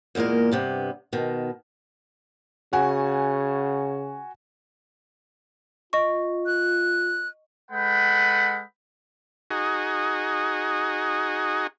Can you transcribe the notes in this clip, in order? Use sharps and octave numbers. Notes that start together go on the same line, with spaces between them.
E2 A#2 G#3 A#3 A#4
G2 C3 B3
B2 D#3
C#3 F#4 F#5 G#5
F4 D#5 C#6
F#6
G#3 A4 B4 F#5 G5 B5
D#4 F#4 G#4